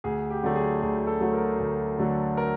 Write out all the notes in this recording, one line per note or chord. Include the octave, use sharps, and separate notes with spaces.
D2 G#4
G4
D3 F#3 A3
G#4
D2 G#4
A4
D3 F#3 A3
A#4
D2
D3 F#3 A3
A#4